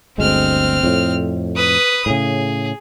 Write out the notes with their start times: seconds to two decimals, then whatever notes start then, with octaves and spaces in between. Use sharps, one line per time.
0.18 G1 D2 G#3 C4 F6
0.83 F2 A2
1.56 B4 D#6
2.06 A2 C#3 G#4